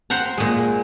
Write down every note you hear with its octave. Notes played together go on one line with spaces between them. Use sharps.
C5 F#5 G5 A#5
A#2 G#3